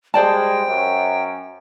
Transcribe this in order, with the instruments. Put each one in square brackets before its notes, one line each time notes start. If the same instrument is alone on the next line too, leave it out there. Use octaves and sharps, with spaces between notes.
[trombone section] G3 G#3 [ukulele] C5 D5 A5 [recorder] G5
[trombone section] F#2